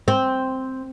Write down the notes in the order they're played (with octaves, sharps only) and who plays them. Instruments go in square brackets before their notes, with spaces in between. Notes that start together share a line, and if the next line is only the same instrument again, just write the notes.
[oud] C4